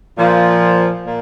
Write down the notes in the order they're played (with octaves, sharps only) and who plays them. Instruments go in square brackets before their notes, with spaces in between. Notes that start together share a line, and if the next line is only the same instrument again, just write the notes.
[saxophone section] A#2 F3
A#2